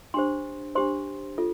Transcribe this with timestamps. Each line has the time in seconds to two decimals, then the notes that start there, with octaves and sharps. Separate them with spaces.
0.14 D4 G4 C5 C6
0.75 D4 G4 C5 C6
1.38 F4 A4